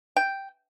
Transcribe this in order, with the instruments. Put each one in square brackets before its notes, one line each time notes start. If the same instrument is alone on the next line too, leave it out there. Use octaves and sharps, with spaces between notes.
[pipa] G5